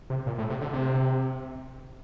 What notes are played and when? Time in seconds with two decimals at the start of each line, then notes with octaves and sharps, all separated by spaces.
0.10 C3
0.26 A#2
0.38 A2
0.50 C3
0.61 D3
0.73 C3